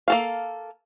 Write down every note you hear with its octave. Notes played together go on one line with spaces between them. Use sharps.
A#3 A4 F5